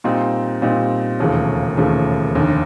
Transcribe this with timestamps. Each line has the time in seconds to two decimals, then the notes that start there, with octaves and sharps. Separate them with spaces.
0.04 A#2 G3 C4 D#4
0.62 A#2 G3 C4 D#4
1.20 E1 D#2 C#3 F3 A3
1.77 E1 D#2 C#3 F3 A3
2.35 F1 D#2 D3